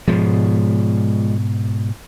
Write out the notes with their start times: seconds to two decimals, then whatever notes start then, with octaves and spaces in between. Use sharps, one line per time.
0.08 G#2 B2 F3 G#3